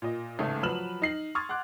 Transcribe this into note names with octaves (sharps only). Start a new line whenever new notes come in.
A#2 D#5
A1 G#2 C#3 A3
F3 F#3 B4 F6 E7 F#7
D#4 C7 F#7
C6 C#6 D#6 F6 G#6 A6
F#5 C6 D6 F#6